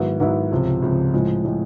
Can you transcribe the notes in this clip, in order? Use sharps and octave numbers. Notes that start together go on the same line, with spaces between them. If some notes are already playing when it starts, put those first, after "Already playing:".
Already playing: G#2 D#3 F#3 B3 E4
G#2 D#3 F#3 B3 E4
C#2 C3 F3
C#2 C3 F3
A2 F3 G#3
A2 F3 G#3